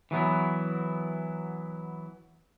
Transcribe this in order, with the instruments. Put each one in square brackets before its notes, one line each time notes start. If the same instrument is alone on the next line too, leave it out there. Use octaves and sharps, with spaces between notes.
[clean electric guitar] E3 F#3 B3 E4